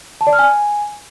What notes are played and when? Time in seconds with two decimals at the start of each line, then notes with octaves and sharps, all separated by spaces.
0.21 A5
0.27 D5
0.33 F6
0.39 G#5